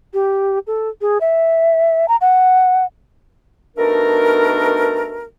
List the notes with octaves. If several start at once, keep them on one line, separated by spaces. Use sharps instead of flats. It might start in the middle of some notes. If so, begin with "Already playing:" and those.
G4
A4
G#4
E5
A#5
F#5
B2 A3 D4 D#4 A#4